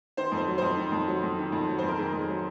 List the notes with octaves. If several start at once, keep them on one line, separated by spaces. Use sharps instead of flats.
D#3 C5
F2
C5
F#3
F2 C5
D#3
F2
F#3
F2
D#3
F2
F#3
F2 C5
A#4
D#3 G#4
F2
G#4
F#3